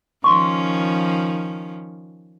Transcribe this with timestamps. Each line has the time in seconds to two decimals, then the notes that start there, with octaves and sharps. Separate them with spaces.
0.24 D#3 F3 C#4 C6 C#6